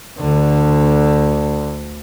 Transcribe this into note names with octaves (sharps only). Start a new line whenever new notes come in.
D2 D3